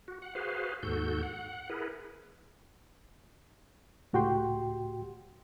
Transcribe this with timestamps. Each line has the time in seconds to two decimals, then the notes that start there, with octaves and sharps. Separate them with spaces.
0.08 F#4
0.22 F#5
0.35 F#4 G#4 B4 C5 F5
0.83 D#2 G#2 F#4 A4 G6
1.22 F#5
1.69 E4 G#4 A#4 B4
4.13 C#2 A2 F#4 G4 G5 C6